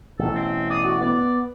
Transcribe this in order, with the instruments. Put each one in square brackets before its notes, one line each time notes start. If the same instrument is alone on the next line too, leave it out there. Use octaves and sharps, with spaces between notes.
[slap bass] A1 B2 [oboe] A4
[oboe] C4
[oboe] D5 [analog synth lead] D#6
[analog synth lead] F#4
[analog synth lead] B3 [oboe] D5